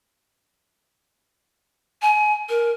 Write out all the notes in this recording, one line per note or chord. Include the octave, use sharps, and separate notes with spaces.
G#5
A#4